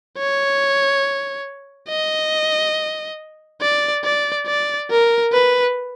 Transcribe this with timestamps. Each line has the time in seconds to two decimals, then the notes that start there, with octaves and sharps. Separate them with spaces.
0.18 C#5
1.89 D#5
3.61 D5
4.04 D5
4.47 D5
4.91 A#4
5.33 B4